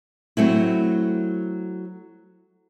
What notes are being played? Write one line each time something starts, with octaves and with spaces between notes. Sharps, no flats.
F#3 A3 C4 E4